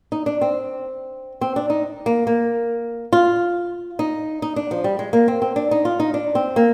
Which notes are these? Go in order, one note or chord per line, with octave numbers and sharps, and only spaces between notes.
D#4
D4
C4
C4
D4
D#4
A#3
A#3
F4
D#4
D#4
D4
F3
G3
G#3
A#3
C4
C4
D4
D#4
F4
D#4
D4
C4
A#3